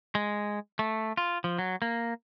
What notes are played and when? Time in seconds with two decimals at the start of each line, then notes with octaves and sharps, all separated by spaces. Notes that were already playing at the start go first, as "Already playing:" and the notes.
0.15 G#3
0.79 A3
1.17 F4
1.44 F3
1.58 F#3
1.82 A#3